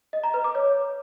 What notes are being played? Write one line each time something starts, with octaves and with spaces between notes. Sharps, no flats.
D#5
A#5
B4
D6
C#5